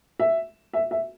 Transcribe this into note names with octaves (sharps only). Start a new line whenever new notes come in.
E5
E5
E5